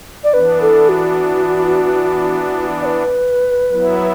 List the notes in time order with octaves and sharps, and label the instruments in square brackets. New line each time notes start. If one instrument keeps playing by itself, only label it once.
[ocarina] D5
[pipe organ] E3 B3 D4 [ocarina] B4
[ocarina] A4
F#4
D5
B4
[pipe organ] F#3 B3 E4